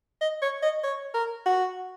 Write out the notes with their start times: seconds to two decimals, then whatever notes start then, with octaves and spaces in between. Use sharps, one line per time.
0.21 D#5
0.42 C#5
0.62 D#5
0.83 C#5
1.14 A#4
1.46 F#4